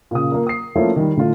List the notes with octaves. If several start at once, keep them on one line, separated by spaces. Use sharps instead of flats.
A#2 C#3 D#6
A#3 F4 A#4
D#6 C7
F3 A3 A#3 C#4 E4 F4
D#3 G3
A2 D3 A3 F4